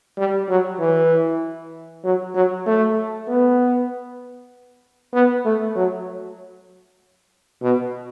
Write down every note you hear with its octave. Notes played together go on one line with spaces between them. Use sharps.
G3
F#3
E3
F#3
F#3
A3
B3
B3
A3
F#3
B2